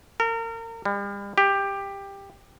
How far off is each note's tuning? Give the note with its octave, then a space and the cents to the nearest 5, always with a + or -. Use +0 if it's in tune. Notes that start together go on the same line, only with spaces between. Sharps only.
A#4 -35
G3 +40
G4 +15